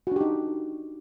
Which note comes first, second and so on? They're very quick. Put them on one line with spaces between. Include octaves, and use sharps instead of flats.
F#4 D4 G4 D#4